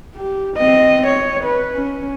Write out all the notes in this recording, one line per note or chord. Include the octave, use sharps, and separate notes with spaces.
G4
C4 D#5
C#5
B4
C#4